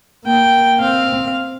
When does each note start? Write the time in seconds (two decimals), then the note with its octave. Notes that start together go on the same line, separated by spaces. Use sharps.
0.25 A#3 G5
0.80 C4 F5